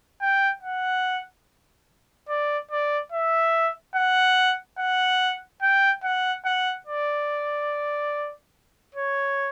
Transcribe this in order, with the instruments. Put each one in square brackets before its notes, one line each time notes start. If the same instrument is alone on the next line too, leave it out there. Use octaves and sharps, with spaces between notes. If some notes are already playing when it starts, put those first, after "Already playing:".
[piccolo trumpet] G5
F#5
D5
D5
E5
F#5
F#5
G5
F#5
F#5
D5
C#5